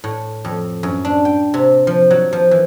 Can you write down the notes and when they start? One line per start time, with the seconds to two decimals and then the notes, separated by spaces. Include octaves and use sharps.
0.04 A2
0.45 F2
0.83 F#2
1.05 D4
1.25 G5
1.54 C3
1.87 F3
2.11 F#3
2.33 F3
2.51 E3